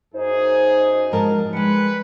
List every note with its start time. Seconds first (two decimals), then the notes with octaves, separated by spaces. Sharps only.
0.14 F#2 D#4 G#4 C5
1.12 G#2 F3 A#4 A5
1.53 G3 G#3 B4 C#7